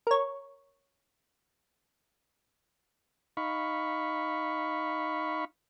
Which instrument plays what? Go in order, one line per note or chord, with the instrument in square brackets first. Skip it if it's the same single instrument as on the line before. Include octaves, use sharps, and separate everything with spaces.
[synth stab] A#4 C#5
[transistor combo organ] D#4 F5 B5 C#6